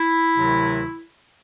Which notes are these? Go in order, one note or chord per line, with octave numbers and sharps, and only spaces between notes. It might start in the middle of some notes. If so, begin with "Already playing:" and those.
Already playing: E4
D2 C3 D#3 F#3